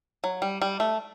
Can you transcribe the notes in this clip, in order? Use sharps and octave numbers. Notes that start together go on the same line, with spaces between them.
F#3
G3
G3
A3